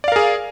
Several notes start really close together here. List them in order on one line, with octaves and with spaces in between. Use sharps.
D5 F5 A#4 G#4